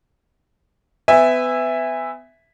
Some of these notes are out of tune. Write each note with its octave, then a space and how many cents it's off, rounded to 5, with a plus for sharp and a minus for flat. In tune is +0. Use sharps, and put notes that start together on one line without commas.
B3 +30 E5 +0 G#5 -20